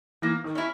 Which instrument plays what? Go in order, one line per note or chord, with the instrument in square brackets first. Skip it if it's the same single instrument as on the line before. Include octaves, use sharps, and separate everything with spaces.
[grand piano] E3 [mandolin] A#3
[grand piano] D#3
[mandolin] C#4 E4